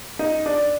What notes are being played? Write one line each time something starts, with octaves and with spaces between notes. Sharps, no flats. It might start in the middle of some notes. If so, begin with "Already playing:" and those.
D#4
D4